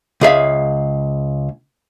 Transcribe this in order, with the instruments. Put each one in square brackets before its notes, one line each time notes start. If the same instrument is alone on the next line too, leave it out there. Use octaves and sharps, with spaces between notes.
[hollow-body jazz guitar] C#2 G#4 E5 F5